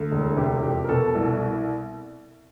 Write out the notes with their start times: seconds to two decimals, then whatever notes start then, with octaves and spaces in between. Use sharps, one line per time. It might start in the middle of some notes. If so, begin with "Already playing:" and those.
Already playing: D2
0.12 E1
0.37 C3 G4
0.62 F2 G4
0.84 A#4
0.89 B2 A4
1.15 C2